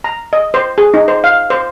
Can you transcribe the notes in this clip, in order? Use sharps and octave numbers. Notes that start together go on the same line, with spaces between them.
A#5
D#5
C5
G#4
D#4
C5
F5
C5